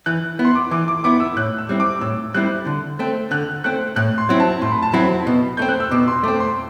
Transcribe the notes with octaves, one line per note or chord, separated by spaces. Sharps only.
E3 F#6
B3 E4
C6
D6
E3 D6
D6
B3 E4 D6
E6
A2 F#6
E6
G3 C4 E4
D6
A2 E6
G3 C4 E4 F#6
D3
A3 C4
D3 F#6
A3 C4 F#6
A2 F#6
C6
F#3 C4 E4
A5
A2 C6
B5
A5
F#3 C4 E4 B5
B2
A3 C4 G6
F#6
E6
B2 D6
C6
A3 C4 D6
C6